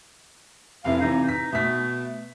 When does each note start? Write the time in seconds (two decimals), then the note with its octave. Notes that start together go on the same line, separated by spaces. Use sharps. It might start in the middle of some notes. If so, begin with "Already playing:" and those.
0.84 F1 C3 E4 F5
1.00 C3 E3 D#4
1.29 D#4 B6
1.52 B2 A3 B6